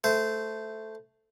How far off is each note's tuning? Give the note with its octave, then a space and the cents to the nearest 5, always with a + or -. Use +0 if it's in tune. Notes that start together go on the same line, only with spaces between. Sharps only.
A3 +0 C5 -15